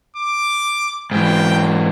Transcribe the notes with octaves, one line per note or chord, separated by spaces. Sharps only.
D6
G#2 E3 G5